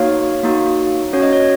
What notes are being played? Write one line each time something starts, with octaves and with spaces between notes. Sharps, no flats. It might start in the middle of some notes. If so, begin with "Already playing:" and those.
Already playing: A#3 D#4 F#4 C#5 F5
A#3 D#4 F#4
C#4 F#4 C#5
D#5
C#5